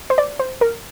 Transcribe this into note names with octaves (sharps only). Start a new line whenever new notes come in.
C5
D5
C5
A#4